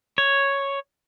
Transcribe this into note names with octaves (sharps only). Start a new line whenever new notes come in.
C#5